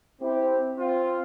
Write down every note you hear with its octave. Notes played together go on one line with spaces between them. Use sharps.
C4 E4 G4
C4 F4